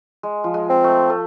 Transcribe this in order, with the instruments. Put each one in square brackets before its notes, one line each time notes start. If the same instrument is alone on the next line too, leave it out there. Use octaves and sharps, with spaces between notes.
[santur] G#3
F3
G#3
[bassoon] C4
[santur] A3
A3